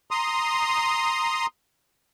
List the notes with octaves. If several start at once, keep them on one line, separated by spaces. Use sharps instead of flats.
A#5 C6 D#6